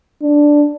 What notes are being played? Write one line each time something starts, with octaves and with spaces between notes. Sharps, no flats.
D4